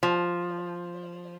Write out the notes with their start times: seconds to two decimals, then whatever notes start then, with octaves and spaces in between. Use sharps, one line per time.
0.03 F3